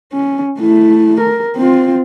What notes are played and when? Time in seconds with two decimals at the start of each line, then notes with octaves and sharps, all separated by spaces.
0.13 C#4
0.59 A3 E4
1.20 A#4
1.56 C4 F4